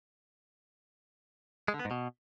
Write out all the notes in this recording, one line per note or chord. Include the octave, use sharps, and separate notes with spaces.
G#3
D3
B3
G#2
B2